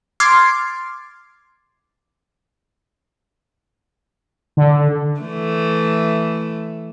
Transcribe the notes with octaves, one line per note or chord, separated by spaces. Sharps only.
C6 D6 F6 G#6 A6 C7
D3
E3 A3